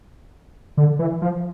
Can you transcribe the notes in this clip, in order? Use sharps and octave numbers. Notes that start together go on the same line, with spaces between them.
D3
E3
F3